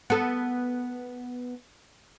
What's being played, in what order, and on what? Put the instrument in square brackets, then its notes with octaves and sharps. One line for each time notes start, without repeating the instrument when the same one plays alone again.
[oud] B3 A4